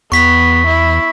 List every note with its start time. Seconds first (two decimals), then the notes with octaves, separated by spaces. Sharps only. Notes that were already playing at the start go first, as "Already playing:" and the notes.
0.12 E2 B3 C#6 B6
0.67 E4